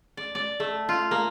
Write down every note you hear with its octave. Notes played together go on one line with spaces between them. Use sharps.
D5
D5
A3
F4
A#3